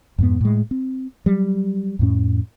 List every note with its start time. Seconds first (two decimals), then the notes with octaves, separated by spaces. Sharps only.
0.18 F2 G#2 B3
0.41 A2 G#3
0.71 C4
1.26 F#3 G3
1.99 F2 A2 C#4